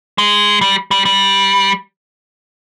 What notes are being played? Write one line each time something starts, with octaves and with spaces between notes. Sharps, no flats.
G#3
G3
G3
G3